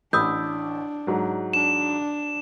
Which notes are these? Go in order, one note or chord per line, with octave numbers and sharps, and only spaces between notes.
A1 D4 B5 D#6 E6 G6
G#2 F#3
D4 E7